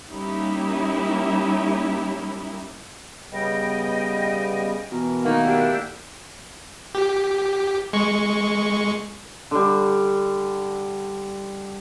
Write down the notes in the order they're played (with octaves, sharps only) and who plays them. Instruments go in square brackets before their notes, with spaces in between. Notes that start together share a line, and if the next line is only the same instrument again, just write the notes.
[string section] G3 A#3 C#4 D#4 E4 G4
[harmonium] C#3 G3 B3 [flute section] D#5 G5
[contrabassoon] B2 [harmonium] E3 A#4
[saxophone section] D#3 A#3 [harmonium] A3 F#5 [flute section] D#4 A#4
[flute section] D4 E4 G4
[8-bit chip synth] G4
G#3 C#6
[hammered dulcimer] D3 G3